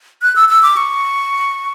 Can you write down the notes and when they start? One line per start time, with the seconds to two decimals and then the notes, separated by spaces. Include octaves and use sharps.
0.22 F#6
0.36 E6
0.49 E6
0.62 D6
0.77 C#6